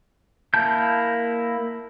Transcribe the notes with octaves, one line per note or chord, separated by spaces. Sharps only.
A#3 E4 A5 G6